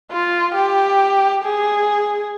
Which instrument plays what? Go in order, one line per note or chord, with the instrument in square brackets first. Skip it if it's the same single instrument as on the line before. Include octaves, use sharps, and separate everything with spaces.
[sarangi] F4
G4
G#4